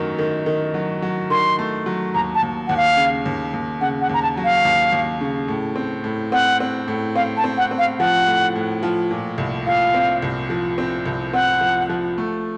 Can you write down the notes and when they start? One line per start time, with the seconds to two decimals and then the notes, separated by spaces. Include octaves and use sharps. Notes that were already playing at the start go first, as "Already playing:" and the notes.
Already playing: F#2 D#3 F#3 A3
0.18 D#3
0.46 D#3
0.74 F#3
1.02 F#3
1.30 D#3 C6
1.59 A3
1.86 F#3
2.14 D#2 A#5
2.35 A5
2.42 D#2
2.67 D#2 F#5
2.77 F5
2.97 C#3
3.26 D#2
3.53 D#2
3.81 C#3 F#5
4.01 F#5
4.09 D#2 A#5
4.22 A5
4.37 F#3
4.44 F5
4.65 D#2
4.92 D#2
5.21 C#3
5.48 A2
5.76 C4
6.04 A2
6.32 C4 F#5
6.60 C4
6.88 A2
7.16 C4 F5
7.37 A5
7.44 C4
7.58 F#5
7.71 C4
7.78 F5
7.99 F3 F#5
8.27 A2
8.55 A2
8.83 F3
9.11 A#2
9.38 C2
9.66 A#2 F5
9.94 C4
10.22 C2
10.50 F3
10.78 C4
11.06 C2
11.34 C4 F#5
11.61 F3
11.89 F3
12.18 A3